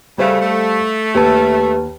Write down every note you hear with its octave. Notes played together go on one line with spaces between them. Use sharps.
C#3 G3 A3 C5 F5
A3
D#2 G4 B4 A5